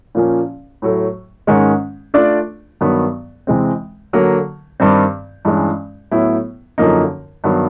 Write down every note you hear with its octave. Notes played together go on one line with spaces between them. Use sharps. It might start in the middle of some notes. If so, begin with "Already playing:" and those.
A#2 F3 A#3 C#4
A2 F#3 A3
G#2 D#3 G#3 C#4
A3 D4 F4 A4 D5
G2 D#3 F#3 B3
C3 E3 G#3 C4
D3 F#3 A#3
G2 D#3 G3 C4
G2 E3 G#3 C#4
A2 F#3 B3 E4
F#2 D3 F3 A#3 D#4
G2 D#3 F#3 B3